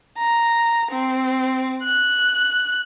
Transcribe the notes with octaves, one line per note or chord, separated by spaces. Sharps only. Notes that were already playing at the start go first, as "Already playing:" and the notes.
A#5
C4
F#6